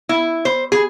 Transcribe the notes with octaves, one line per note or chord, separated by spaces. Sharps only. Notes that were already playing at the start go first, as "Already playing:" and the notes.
E4
C5
G#4